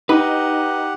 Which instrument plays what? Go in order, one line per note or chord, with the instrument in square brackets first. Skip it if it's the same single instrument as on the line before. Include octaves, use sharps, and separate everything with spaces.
[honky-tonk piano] D#4 [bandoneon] G4 F#5 [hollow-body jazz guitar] B4